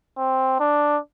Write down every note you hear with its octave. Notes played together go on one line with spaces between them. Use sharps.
C4
D4